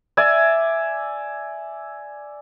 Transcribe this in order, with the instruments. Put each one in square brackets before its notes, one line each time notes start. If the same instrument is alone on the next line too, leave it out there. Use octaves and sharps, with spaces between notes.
[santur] D5 E5 G#5